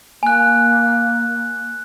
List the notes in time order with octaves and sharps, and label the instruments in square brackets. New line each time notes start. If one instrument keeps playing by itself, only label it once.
[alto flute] A#3 [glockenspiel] G#5 F#6